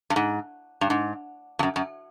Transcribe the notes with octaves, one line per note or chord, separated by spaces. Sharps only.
G2
G#2
G2
G#2
F2
F#2
F#2